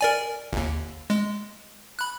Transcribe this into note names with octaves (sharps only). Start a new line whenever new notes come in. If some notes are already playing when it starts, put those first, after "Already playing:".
A#4 D5 G#5
G1 D#2
G#3
B5 F#6